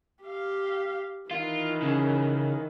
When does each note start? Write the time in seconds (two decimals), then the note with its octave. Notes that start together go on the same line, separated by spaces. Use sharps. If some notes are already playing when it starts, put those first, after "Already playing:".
0.23 G4 F5
1.31 D#3 E3 F4
1.82 C#3